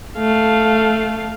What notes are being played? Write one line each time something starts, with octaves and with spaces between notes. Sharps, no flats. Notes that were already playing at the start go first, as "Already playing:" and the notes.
A3 F5